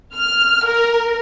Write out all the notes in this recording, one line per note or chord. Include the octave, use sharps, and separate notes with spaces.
F6
A#4